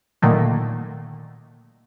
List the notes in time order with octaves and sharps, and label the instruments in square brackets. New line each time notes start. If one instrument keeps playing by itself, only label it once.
[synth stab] A#2 D3 D#3 F#3 A3 A#3